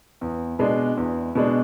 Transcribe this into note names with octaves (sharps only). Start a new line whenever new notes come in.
E2
B2 G#3 D4
E2
B2 G#3 D4